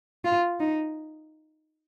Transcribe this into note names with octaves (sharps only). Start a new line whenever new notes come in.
F4
D#4